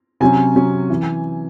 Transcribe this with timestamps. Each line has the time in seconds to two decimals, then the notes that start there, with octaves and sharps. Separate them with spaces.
0.20 C3 F#3 C#4 G#5
0.55 C3 F#3 C#4
0.90 E3